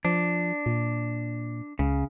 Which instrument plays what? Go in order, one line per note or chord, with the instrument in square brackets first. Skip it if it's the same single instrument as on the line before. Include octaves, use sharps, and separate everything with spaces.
[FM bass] F3 [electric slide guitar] D4
[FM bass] A#2
[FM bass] C#2 [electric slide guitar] C#3